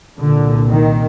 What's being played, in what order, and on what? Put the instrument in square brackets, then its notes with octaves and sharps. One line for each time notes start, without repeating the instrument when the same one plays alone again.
[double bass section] C2 A#2 D3
D#3